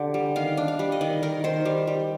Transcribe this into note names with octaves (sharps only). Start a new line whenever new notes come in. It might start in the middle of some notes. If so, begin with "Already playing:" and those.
Already playing: D3 G4
G3
D#3 F5
D4
F5
G3
D#5
D#3 D5
D#3 A#4
D#3 C5
G3
G3